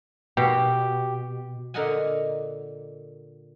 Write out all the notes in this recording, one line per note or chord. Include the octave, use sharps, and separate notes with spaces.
B2 G4
A#2 D3 A#4 D#5 F#5 G#5